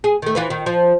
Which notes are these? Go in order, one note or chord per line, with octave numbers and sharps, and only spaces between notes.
G#4
D#3 A3
E3 F4 B4
D#3
F3